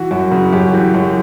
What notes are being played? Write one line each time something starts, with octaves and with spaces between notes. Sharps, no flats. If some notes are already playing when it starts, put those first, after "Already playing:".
Already playing: E3 F#4
F#2 F#4
C#3 F#4
F#2 G4
G4
E3 F#4
F#2